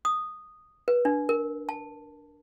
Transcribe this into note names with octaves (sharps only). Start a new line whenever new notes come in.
D#6
B4
D4
A#4
A5